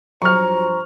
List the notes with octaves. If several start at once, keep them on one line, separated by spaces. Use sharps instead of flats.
G2 F3 F#3 C5 A#5 C#6 F6